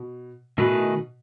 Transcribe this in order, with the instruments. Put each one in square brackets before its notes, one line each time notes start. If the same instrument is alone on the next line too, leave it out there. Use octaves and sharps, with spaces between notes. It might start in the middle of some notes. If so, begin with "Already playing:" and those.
Already playing: [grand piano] B2
[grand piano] B2 [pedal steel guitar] D#3 A3 E4 G#4 B4